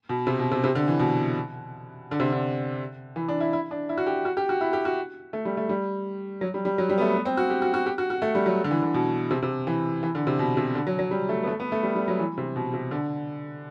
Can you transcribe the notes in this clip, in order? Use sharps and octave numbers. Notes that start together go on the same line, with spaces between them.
B2
C3
B2
C3
C3
D3
E3
B2
D3
C3
D3
E3
D4
E4
E4
D4
E4
F#4
G4
F#4
G4
F#4
E4
G4
F#4
A3
G3
A3
G3
F#3
G3
G3
F#3
G3
B3
A3
B3
C4
F#4
G4
F#4
F#4
G4
F#4
F#4
A3
G3
F#3
D3
E3
D3
B2
C3
C3
E3
E3
D3
C3
B2
C3
D3
F#3
F#3
G3
A3
B3
A3
B3
A3
G3
G3
F#3
E3
C3
B2
C3
D3